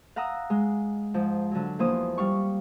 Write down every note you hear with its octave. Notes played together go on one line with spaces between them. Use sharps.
F5 F#5 A#5 D#6 E6
G#3
G#2 F3
D3 F#3
E2 F3 A#3 C5 D#6
G3 F5 C#6